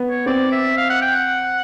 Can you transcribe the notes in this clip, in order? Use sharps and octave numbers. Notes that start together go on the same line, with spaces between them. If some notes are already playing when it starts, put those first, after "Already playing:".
Already playing: B3
C#5
C4 D5
E5
F5
F#5
G5
F#5